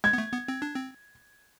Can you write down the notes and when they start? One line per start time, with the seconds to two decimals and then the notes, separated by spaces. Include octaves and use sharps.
0.04 G#3 G#6
0.13 B3
0.18 A3
0.33 B3
0.48 C4
0.62 D4
0.75 C4